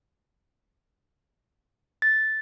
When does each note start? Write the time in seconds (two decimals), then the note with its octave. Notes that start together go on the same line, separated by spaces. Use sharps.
2.02 A6